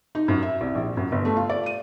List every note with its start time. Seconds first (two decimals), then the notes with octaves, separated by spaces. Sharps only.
0.15 D#4
0.28 F#2
0.42 E5
0.61 C2
0.75 A#1
0.97 F#2
1.12 G1
1.25 A3
1.37 F4
1.50 D5
1.66 D#7